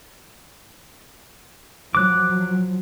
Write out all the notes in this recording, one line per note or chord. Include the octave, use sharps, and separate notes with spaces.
F3 F#3 D6 F#6